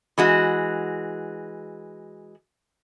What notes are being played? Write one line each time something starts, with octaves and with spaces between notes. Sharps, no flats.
E3 G#3 F#4